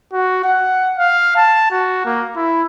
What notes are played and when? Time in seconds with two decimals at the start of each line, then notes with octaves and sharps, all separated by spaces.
0.13 F#4
0.44 F#5
0.98 F5
1.36 A5
1.71 F#4
2.05 A#3
2.36 E4